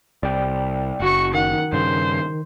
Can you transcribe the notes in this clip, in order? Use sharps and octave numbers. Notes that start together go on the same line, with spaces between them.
C2 D5 G5
F#1 F#4 C#6
D#3 F#5
G2 C#3 C5